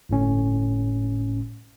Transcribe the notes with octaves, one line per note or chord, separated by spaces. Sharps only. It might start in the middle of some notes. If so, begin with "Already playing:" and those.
G1 A2 C#4